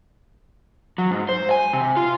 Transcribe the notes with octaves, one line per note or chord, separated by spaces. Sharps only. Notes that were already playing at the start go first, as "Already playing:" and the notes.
F#3
G#2
C5
G#5
C3
F4